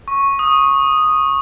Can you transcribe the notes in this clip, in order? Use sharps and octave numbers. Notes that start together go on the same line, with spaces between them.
C#6
D#6